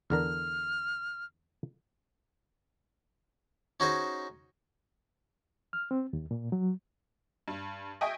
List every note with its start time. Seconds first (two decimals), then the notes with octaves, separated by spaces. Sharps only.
0.10 E2 D3 A#4 F6
3.80 C#4 D#4 F#4 G#4 C5 D#5
5.73 F6
5.91 C4
6.13 D#2
6.31 A#2
6.52 F#3
7.48 G2
8.01 D#5 E5 G5 G#5 C#6 D#6